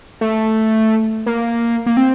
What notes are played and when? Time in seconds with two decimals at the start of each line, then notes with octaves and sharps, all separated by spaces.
0.21 A3
1.26 A#3
1.86 A#3
1.97 C4